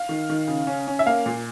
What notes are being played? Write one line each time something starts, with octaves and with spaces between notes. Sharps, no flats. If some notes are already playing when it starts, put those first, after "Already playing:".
Already playing: F5
D#3
D#3
C#3
C#4
C#4
E5
A#3 F5
A#2